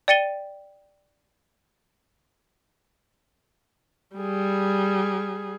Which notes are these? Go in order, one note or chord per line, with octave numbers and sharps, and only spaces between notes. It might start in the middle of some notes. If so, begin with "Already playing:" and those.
D5 G5 A6 C#7 D#7 G7
G3 G#4